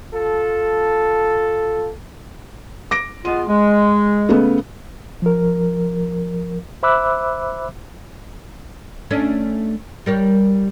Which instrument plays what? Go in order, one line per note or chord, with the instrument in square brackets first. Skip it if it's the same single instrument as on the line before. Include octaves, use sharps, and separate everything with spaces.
[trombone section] F4 A4
[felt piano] D6 A#6 D7
[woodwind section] G#3 B3 F4 [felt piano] D#7
[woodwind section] G#3
[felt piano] C#3 A3 B3
[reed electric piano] F3 A#4
C5 E5 B5 D6 E6 F#6
[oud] A3 C#4 D4
G3 A#4 C#5